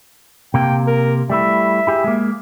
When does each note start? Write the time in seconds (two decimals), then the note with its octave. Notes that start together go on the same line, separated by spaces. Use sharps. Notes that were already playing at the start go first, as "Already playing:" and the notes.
0.54 C3 A#3 G5
0.87 A#4
1.30 G3 A3 E4 E5
1.87 E4 G4 G#4
2.04 G#3 A#3